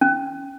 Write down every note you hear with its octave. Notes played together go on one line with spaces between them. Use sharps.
C#4